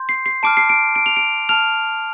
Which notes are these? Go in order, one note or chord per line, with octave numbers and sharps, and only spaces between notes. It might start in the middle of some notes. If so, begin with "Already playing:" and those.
Already playing: C6 G6
C7
C7
A5 D6 F6 D7
C7
D7
D7
F7
D7
A5 F6 F7